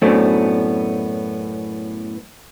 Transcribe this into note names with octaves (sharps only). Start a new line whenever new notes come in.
F#2 A2 A3 B3 C4 D4